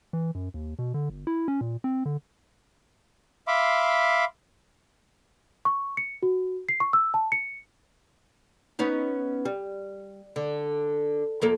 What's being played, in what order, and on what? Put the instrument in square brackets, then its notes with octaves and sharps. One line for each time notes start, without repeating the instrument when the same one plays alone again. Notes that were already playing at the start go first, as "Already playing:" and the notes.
[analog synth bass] E3
F#2
D#2
B2
D3
G1
E4
C#4
A#2
C4
D3
[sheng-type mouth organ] E5 F5 B5 C6 D6
[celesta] C#6
C#7
F#4
C7
C#6
E6
A5
C#7
[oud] B3 C#4 D#4
G3
D3
F2 A#3 A4